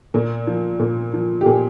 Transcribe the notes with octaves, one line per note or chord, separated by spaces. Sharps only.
A#2
F3
A#2
F3
G4
A#2 G#4